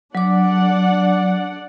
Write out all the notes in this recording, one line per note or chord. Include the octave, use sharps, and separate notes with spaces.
F#3 D4 D5 F#5 D6